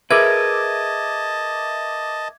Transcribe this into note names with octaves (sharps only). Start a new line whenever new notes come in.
G#4 A#4 B4 D#5 E5 A5 D6 G#6